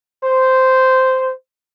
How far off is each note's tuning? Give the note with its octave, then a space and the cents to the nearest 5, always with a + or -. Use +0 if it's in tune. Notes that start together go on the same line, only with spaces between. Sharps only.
C5 -10